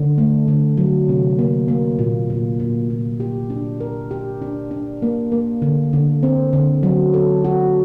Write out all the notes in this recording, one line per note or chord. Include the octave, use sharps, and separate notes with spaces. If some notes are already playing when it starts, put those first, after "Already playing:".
Already playing: D3
A3
D3
F#3
C3
A#3
A#3
A#2
A#2
A#2
A#2
G4
D4
A#4
G4
D4
D4
A#3
A#3
D3
D3
C4
D3
F#3
A4
F#4